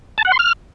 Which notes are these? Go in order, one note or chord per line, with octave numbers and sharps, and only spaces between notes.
A5
F#5
C6
F6